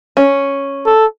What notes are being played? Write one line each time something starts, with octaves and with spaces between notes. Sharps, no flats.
C#4
A4